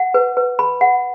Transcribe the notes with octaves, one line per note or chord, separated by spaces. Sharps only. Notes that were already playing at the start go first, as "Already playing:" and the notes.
Already playing: F#5
B4
B4
B5
F#5